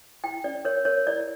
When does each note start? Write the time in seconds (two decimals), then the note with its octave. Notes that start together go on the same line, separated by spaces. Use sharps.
0.24 E4 G5
0.44 C#4 D5
0.65 A#4 C#5
0.85 A#4 C#5
1.07 E4 D5